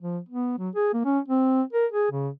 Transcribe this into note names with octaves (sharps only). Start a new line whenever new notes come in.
F3
B3
F#3
G#4
A#3
C#4
C4
A#4
G#4
C#3